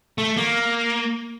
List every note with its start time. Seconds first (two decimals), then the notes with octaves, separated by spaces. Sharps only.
0.18 A3
0.37 A#3